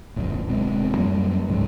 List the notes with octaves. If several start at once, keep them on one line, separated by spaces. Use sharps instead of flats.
D1 A#1 F#2
D1 B2 G#3 C4
F#2 F#3 G3 A#3
C#2 G#2 F3